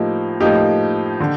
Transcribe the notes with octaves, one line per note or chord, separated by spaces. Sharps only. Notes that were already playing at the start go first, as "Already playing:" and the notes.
Already playing: A2 F3 A#3 D#4 G4
A2 F3 A#3 D#4 G4
D3